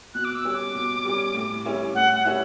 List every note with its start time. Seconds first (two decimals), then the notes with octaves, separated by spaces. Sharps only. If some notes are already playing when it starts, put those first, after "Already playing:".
0.14 B2 F#6
0.24 D6
0.35 E6
0.45 G3 C#4
0.54 D6
0.75 B2
1.05 G3 C#4
1.34 A2
1.66 G3 C#4 E4
1.95 A2 F#5
2.15 F#5
2.25 G3 C#4 E4